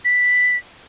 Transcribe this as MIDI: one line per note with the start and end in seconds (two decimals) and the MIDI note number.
0.05 0.56 95